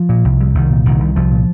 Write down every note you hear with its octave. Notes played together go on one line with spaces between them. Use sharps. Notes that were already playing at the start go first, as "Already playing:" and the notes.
Already playing: F3
A#2
C2
C2
C2 D#3
A#2
C2 D#3
C2
C2 F3
A#2